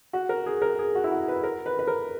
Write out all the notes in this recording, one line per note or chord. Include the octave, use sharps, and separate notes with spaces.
F#4
A#4
G#4
A#4
G#4
F#4
E4
F#4
B4
A#4
B4
B4
A#4